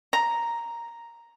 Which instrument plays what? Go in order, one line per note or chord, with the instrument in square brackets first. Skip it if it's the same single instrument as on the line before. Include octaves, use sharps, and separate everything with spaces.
[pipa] A#5